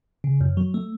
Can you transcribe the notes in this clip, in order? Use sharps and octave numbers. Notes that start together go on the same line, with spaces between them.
C#3
F#2
F#3
A3